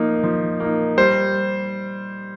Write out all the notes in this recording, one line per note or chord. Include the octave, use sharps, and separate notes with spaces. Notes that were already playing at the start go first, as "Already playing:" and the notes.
Already playing: F3 A#3 D#4
F3
A#3 D#4
G3 C5